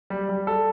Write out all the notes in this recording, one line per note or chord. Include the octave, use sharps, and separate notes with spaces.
G3
G3
A4